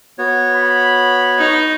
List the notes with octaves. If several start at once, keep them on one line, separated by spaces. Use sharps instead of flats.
B3 F#4 C#5
B5
D#4